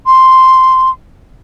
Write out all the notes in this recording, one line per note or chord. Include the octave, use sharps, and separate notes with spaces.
C6